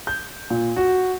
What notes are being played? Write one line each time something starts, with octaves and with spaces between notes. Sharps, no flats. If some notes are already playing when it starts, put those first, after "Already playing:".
G6
A#2
F#4